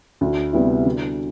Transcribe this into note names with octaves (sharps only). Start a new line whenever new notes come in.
D2
C3 G3 B3 E4
D3